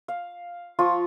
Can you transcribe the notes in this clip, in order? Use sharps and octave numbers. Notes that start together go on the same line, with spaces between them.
F5
F3 F4 C#6 D#6